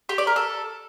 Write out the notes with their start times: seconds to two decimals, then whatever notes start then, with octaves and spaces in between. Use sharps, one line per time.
0.09 G4
0.18 D5
0.27 A#4
0.36 A4